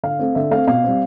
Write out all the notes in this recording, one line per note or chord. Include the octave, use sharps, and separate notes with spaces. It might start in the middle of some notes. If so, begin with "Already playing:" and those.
D3 F5
A3 C4
D3 E5
A3 C4 F5
B2 F5
G3 C4